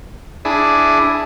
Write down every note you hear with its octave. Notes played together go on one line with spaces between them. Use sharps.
D4 E4 G#4